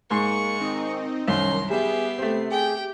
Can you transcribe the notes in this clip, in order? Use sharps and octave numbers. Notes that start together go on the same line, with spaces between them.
G#2 G#3 A#3 C6 C#6
D#3 C4 D#4 D#5
C2 F#2 D#3 C#4 A#5 C6
G3 B3 G4 G#4 E5 C7
C3 A3 C4
G4 G#4 G5